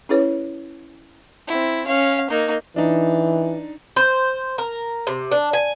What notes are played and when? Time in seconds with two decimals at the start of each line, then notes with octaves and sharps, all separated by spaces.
0.09 C#4 E4 G#4 B4 C#5
1.47 C4 E4
1.87 C#4 F5
2.30 A#3 D#4
2.76 E3 D4 D#4
3.96 C5
4.58 A#4
5.07 C3
5.32 D4
5.53 G#5